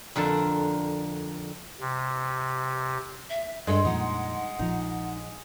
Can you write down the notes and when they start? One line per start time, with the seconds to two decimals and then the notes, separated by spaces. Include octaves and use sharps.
0.16 F2 D3 A#4 A5
1.80 C3
3.30 E5
3.67 G2 G#3 A4
3.85 F2 A#2 F3 D#4 F#5
4.59 A#1 F3 D#4